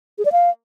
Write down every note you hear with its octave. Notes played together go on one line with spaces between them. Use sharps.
G#4
D5
F5